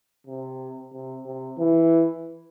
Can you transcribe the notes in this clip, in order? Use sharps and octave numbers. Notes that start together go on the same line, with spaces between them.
C3
C3
C3
E3